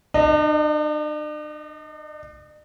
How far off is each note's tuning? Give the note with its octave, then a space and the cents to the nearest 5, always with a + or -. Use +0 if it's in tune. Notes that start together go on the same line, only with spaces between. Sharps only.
D4 +45 D#5 +0